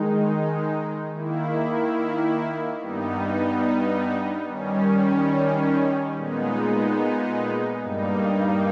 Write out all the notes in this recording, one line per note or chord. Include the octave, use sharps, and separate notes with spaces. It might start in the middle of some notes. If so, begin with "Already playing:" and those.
Already playing: D#3 G#3 D#4
D#3 A#3 E4
G2 G3 B3 D#4
D#3 G3 C#4
A#2 G#3 B3 D#4
G2 G3 A#3 D#4